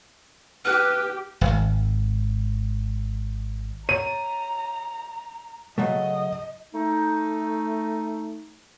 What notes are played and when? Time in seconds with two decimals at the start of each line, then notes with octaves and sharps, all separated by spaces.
0.65 G4 B4 F6 F#6
1.41 D#1 G#1
3.89 C#5 A#5 D#7
5.78 C#3 F#3 A3 D#5
6.74 A3 D#4